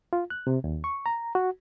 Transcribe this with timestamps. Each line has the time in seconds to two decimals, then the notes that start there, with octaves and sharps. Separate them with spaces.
0.13 F4
0.30 F#6
0.47 C3
0.64 D#2
0.84 C#6
1.06 A#5
1.35 F#4